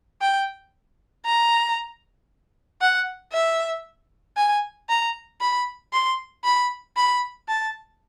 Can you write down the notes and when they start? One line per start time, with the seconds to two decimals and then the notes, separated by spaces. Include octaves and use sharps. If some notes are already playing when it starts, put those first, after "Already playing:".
0.21 G5
1.25 A#5
2.81 F#5
3.33 E5
4.37 G#5
4.89 A#5
5.40 B5
5.93 C6
6.44 B5
6.97 B5
7.48 A5